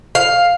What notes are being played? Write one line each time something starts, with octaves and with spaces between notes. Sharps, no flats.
F5